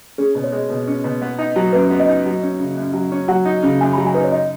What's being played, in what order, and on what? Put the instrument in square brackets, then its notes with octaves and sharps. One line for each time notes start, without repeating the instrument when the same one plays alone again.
[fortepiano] C#4 [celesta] G#4
[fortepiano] B2
[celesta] C#5
[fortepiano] G#3
B2
C#4
B2
B3
D#4
F#3
[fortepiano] F#2 [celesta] B4
[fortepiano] B3
[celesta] D#5
[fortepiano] D#4
F#3
C#4
C#3
F#2
F#3
C#4
[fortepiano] F#3 [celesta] F#5
[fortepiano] D#4
C#3
[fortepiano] F#2 [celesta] G#5
[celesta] B5
[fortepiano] F#3
[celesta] G#5
[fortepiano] D#4 [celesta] B4
[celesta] C#5
[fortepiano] D#4 [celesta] D#5